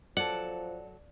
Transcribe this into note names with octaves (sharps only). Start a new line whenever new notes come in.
F3 F#3 A4 D5 F#5